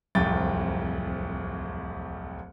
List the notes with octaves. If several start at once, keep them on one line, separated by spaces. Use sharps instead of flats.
D1 C2 F2 G5 A6